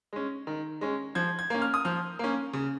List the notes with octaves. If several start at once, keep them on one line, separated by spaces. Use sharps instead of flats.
G#3 C#4
D#3
G#3 C#4
F3 G#6
G#6
A#3 C#4
F6
D#6
F3 F6
A#3 C#4
C#3